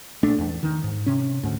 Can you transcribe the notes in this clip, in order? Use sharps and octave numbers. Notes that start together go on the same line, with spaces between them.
A#1 A3 D4
E2
D#3
G#2
C3 C#4
D2 G#2